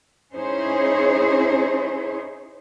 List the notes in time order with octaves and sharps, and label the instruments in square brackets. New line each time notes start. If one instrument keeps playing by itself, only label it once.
[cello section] C#4 D#4 E4 G#4 C5 C#5